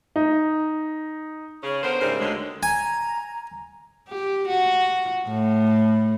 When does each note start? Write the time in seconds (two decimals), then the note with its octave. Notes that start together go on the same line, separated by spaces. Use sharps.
0.16 D#4
1.63 C#3 C#4 G#4
1.83 D3 B3 A#4 C5
2.01 G#2 C#3 G3 E4 A#4 C5
2.20 D2 D3 F#3 G#3
2.63 G#5 A#5
4.09 G4
4.48 F#4
5.28 A2